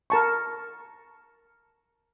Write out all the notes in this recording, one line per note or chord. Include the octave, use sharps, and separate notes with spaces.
A#4 A5 C#6